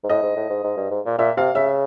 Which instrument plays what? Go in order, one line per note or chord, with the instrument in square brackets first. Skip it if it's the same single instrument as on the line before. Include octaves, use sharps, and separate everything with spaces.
[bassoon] G#2
[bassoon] A2 [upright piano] D#5
[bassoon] G#2
A2
G#2
G#2
G2
G#2
A#2
[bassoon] A#2 [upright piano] E5
[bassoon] C3 [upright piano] F5
[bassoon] C#3 [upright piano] E5